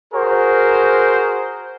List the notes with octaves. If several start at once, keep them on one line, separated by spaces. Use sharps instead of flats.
F#4 G#4 A#4 C5